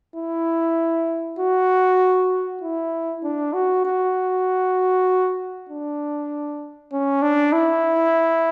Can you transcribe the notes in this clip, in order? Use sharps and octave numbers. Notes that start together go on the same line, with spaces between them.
E4
F#4
E4
D4
F#4
F#4
D4
C#4
D4
E4